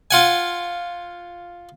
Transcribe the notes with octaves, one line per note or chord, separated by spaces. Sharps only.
F4 F#5 G#5